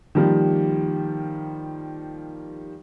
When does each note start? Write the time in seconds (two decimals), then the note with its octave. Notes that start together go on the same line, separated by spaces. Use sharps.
0.15 D#3 F3 G3 A#3